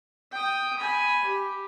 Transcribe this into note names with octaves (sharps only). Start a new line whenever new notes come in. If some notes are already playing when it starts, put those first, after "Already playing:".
G5 D#6
G#5 B5
G4